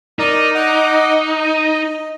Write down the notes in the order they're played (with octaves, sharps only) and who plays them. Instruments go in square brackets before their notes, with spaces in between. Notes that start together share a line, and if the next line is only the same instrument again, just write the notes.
[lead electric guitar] D#4 [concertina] A#4 D5
[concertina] D#5 F#5 D6
D#5